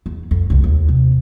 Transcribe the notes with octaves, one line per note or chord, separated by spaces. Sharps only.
E2
F2
C#2 F#2
D#2
C3